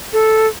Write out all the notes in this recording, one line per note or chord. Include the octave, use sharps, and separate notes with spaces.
A4